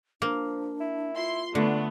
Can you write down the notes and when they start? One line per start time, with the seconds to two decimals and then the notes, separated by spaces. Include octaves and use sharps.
0.22 F3 A#3 D4
0.80 E4
1.17 E4 F4 C6
1.55 D3 A3 B3 D4